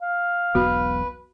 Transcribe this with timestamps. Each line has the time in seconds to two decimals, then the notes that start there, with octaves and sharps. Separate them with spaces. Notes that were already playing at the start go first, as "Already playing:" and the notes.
0.02 F5
0.55 E1 B1 B3 F#4 B4